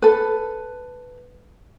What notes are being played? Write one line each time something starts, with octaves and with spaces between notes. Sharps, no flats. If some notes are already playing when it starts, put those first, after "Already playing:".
A4 B4